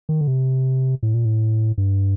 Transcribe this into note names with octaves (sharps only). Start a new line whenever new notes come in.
D#3
D3
C3
A2
A#2
A2
G2